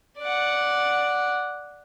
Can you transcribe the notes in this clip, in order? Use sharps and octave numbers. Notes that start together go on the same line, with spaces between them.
D5 F#5